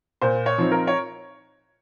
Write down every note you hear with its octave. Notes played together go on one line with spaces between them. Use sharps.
A#2 C5
C#5
F3 C4 D#4
A#4
C#5